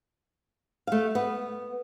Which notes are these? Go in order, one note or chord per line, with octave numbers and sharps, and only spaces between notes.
A3 F5
B3